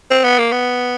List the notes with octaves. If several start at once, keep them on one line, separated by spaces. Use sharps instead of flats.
C4
B3
A#3
B3